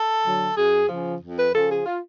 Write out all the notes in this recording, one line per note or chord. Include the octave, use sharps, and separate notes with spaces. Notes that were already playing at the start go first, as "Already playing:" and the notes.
Already playing: A4
D3 F#3
F#2 G#4
C#3 F3
F2
B4
C#3 F3 A4
G#4
F4